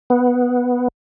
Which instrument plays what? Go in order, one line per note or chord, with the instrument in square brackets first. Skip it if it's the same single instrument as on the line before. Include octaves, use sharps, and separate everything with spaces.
[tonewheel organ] B3